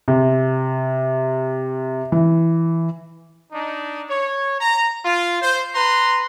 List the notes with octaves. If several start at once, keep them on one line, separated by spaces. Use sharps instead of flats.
C3
E3
D4 D#4
C#5
A#5
F4
C5
B4 A#5 C6